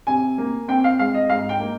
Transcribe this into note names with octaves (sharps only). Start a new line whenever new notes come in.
C3 G#5
A#3
C4 G5
F5
G#3 F5
D#5
G#2 F5
G5
A#3